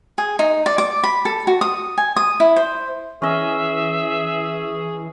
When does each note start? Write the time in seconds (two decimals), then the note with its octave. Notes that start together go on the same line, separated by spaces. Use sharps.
0.18 G#4
0.39 D#4
0.66 D5
0.78 D6
1.04 B5
1.25 A4
1.47 F#4
1.61 D#6
1.98 G#5
2.16 D#6
2.40 E4
2.56 C5
3.22 E3 C#4 G#4 D#5 E5